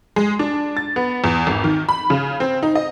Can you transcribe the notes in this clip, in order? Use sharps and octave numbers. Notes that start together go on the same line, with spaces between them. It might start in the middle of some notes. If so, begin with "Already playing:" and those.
G#3
D4
A6
B3
E2
G#1
D#3
B5
C#3
C4
D#4
D#5